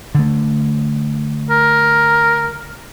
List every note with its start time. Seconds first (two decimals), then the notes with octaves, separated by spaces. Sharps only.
0.15 D3 A3
1.50 A#4